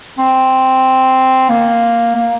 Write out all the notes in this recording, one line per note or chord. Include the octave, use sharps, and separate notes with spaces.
C4
A#3
A#3